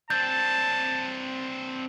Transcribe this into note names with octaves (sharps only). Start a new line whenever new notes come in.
C4 D4 A5 G6 A6